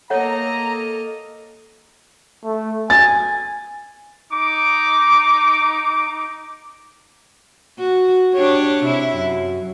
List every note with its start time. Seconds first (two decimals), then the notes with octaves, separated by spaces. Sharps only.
0.10 A#3 A4 C#5 D#5 F#5 A#5
2.44 A3
2.90 G#5 A6
4.31 D#4 D6
7.79 F#4
8.34 D4 G4 C#5
8.85 C3 E4
9.16 F#2